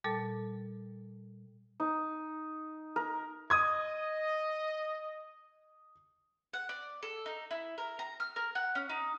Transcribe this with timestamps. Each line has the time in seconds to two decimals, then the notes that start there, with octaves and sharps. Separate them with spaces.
0.04 A#2 G3 A4 A5 A6
1.80 D#4
2.96 A#4
3.50 D#5 D#6 G#6
6.53 F#5
6.69 D5
7.03 A4
7.26 D#4
7.51 E4
7.78 A#4
7.99 A#5
8.20 F6
8.36 A#4
8.55 F#5
8.75 C#4
8.89 D#4